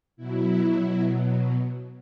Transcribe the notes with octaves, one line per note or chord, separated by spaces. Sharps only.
B2 F#3 E4
B2 F#3